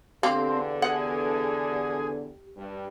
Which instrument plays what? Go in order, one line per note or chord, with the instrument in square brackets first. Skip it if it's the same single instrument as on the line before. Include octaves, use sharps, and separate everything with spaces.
[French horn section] E2 D3 [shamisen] A#3 [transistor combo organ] C4 [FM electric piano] G4
[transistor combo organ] G#4 [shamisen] F#5
[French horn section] G2